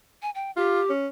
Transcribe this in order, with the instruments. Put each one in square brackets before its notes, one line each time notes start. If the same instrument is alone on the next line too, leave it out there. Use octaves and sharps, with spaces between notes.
[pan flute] G#5
G5
[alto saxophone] F4 [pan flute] G4
[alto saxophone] C#4